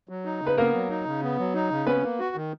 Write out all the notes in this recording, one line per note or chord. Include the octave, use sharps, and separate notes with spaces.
F#3
D#4
C#3
B4
A#3 B3 A#4
F#3
D#4
C#3
B3
F#3
D#4
C#3
B3 C#4 B4
A#3
F#4
D#3